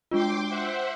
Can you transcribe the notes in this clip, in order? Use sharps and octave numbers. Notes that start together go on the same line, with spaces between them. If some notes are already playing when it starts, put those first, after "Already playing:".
G#3 D4 F4 G5 C6 D6
C5 E5 F#5